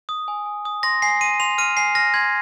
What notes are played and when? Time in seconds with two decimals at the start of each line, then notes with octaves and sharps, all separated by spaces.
0.09 D#6
0.28 G#5
0.46 G#5
0.65 D#6
0.83 C6 A#6
1.02 G#5 C7
1.21 C6 D#7
1.40 C6 F7
1.58 F6 D#7
1.77 G#5 C7
1.95 F6 A#6
2.14 C6 G#6